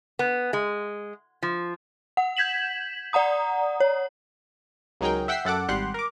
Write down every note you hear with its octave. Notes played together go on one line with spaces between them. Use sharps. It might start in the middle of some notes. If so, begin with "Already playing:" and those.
B3
G#3
F3
F#5
G6 G#6 B6 E7 F#7
D5 F#5 A#5 D#6
C#5
C#2 F#3 D#4 G#4 A#4 G5
E5 F#5 G5 E6 B6 C7
F#2 A4 F#5 D6
G#1 G3 G4 F#5 C6 F#6
A#4 D6